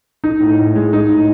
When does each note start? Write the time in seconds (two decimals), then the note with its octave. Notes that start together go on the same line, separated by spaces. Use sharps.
0.24 D#4
0.40 A2
0.59 A2
0.75 G#3
0.93 D#4
1.09 A2